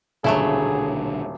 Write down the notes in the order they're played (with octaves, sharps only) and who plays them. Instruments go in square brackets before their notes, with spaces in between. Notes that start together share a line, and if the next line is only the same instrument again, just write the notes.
[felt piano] D#1 [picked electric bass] B1 D3 [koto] F#3 A3 E4 [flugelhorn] G#4